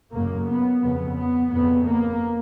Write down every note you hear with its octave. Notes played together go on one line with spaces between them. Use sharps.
F#2 C#3 A#3
B3
F2 C#3 B3
B3
F2 C#3 B3
A#3